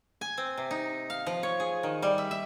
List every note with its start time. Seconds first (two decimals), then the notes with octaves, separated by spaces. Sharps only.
0.21 G#5
0.37 C4
0.57 C3
0.71 D#4
1.10 F5
1.27 F3
1.43 C#5
1.60 G#4
1.83 D#3
2.02 G3
2.18 E5
2.31 E5